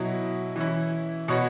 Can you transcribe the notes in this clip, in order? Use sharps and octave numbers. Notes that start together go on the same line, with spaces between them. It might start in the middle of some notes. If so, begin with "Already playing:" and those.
Already playing: B2 F#3 E4
E3 C#4 E4
B2 B3 F#4 C#5